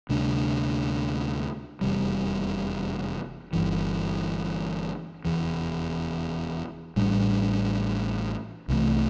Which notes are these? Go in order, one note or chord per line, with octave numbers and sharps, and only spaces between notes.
D2 C3 G3 D4
F1 E2 C3 G3
G1 G2 E3
F1 E2 E3
A1 A2 G3 D4
C2 C3 E3 A3